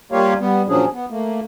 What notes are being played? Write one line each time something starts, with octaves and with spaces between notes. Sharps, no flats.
G3 A#3 F4 G4 C#5 F5
G3 B3
A#2 F3 F#3 C#4 D4 G#4
B3
A3 A#3